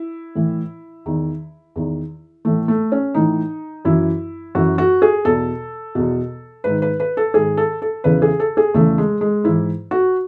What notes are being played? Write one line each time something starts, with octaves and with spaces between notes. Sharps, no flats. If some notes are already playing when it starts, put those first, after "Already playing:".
Already playing: E4
A2 E3
E2 D#3
E2 D#3
A2 E3 A3
A3
C#4
A2 E3 D#4
F#2 E3 E4
F#2 E3 F#4
F#4
G#4
E2 B2 A4
E2 B2
G#2 D#3 B4
B4
B4
A4
G#2 D#3 G#4
A4
A4
E2 C#3 E3 B4
G#4
A4
G#4
E2 C#3 E3 A3
G#3
G#3
G#2 E3 E4
F#4